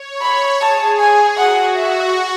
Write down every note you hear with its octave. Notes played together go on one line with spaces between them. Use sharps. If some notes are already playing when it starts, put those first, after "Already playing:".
Already playing: C#5
B5
G#4 A5
G#5
F#4 F#5
E5